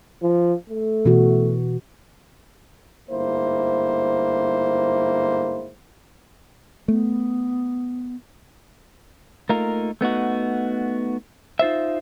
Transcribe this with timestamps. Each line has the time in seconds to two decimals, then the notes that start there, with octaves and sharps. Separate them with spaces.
0.23 F3
0.70 A3
1.05 B2 E3 F#4
3.10 G1 G#2 A#3 E4 C5
6.88 A3 B3
9.49 A3 A#3 D#4 F4 A#4
10.01 A3 B3 D#4 F#4
11.59 D#4 F4 C5 E5